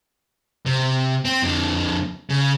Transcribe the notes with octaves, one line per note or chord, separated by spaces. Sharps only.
C3
C4
F2 D3
C#3